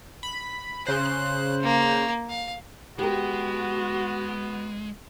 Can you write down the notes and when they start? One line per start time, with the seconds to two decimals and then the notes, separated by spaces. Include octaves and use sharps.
0.23 B5
0.87 C#3 C5 F#6
1.63 A#3
2.30 F5
2.99 G#3 B3 F#4 G4 A#4